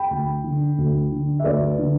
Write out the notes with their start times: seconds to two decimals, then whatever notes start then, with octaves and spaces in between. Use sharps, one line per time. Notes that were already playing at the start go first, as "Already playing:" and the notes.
Already playing: G5 B5
0.10 D2
0.44 D3
0.78 D2
1.11 D3
1.39 E5
1.44 D2 B4 D5
1.79 D3